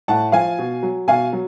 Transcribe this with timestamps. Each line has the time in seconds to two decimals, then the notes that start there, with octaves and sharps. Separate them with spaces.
0.08 A2 F#5 A5
0.32 F3 F5 G#5
0.58 B2
0.83 F#3
1.08 B2 F5 G#5
1.33 F#3